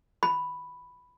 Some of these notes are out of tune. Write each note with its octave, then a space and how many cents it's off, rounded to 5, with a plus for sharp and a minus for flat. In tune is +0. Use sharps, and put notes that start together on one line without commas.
B5 +0